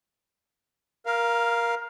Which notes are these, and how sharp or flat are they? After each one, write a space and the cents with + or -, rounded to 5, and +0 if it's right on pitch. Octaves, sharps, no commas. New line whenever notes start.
A#4 +15 F5 -5